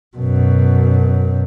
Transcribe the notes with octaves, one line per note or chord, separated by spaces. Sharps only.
F#2 B2